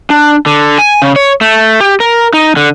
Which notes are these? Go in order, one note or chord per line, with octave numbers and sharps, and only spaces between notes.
D4
D3
G#5
C#3
C#5
A3
G4
A#4
D#4
D3